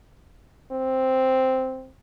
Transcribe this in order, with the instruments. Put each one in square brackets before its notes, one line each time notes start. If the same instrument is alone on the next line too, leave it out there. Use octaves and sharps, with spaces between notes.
[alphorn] C4